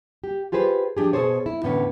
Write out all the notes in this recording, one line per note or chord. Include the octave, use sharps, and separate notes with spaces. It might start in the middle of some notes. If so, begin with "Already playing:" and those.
G4
F4 G4 G#4 B4 C5
F3 D4 G4 G#4
B2 G#4 A4 C5 C#5
E4
E2 A2 D3 B3 C#4 B4